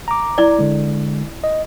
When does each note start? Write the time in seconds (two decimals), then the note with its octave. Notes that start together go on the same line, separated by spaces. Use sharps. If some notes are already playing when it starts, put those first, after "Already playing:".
0.08 A#5 D6
0.38 E4 D5
0.59 D3 G#3
1.44 D#5